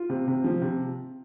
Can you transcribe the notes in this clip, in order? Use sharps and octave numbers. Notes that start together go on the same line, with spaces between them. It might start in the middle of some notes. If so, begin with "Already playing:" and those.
Already playing: F4
C3
C3
F3
C3